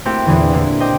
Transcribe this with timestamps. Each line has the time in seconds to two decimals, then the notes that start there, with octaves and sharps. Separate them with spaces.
0.05 A3 A#3 C4 E4 F#4 G4
0.26 E2 A#2 D3 E3
0.53 D3 A#3 E4
0.80 C5 D#5 G5 D6 D#6